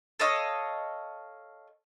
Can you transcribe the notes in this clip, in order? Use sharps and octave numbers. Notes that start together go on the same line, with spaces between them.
A4 C#5 D#5 F5